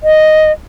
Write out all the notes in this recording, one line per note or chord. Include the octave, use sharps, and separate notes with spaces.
D#5